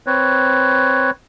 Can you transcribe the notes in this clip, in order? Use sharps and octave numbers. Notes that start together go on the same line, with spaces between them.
C4 B4 C#5